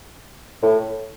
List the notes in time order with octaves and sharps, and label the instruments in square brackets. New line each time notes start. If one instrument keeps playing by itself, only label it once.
[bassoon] A2